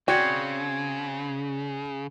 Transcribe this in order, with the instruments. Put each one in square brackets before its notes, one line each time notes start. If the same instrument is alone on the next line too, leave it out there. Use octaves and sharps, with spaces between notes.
[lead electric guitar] C#3 [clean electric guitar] C4 C#5 [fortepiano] F#4 D5 [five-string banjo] G5